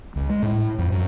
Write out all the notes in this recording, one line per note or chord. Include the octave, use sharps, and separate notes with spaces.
C#2
G#3
A2
F2
F#2